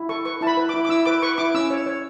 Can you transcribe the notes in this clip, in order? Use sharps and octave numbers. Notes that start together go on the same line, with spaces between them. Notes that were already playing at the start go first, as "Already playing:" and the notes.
Already playing: E4
A4 C#6
B4 C#6
E4 A5
B5
B4
E4 D6
D6
E4 E6
B4 D6
B4 C#6
E4 D6
C#4 E6
C#5
C#5